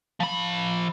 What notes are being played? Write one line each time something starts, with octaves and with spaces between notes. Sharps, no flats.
F3 B5